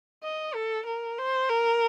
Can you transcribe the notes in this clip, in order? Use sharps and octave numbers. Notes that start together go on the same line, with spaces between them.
D#5
A4
A#4
C5
A#4